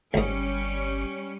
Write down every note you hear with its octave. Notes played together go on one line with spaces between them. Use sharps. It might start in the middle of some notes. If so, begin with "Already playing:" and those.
G1 C#2 G#2 G3 C#4